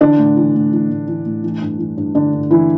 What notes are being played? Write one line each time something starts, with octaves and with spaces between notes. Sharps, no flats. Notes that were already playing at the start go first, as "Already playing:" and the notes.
D3 E3 D4
A2
E3
A2
E3
A2
E3
A2
E3
G2
E3
G2
D3 E3 D4
G2
E3 E4